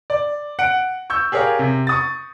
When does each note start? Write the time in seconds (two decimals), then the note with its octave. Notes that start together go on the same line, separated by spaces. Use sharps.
0.10 D5
0.59 F#5 D7
1.10 C#6 E6 G6
1.32 G4 G#4 A#4 C#5 F5
1.59 C3
1.87 C#6 D#6 A6